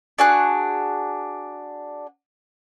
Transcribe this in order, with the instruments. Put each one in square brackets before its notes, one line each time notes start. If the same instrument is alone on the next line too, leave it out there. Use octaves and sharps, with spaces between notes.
[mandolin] D4 F#4 G#4 F#6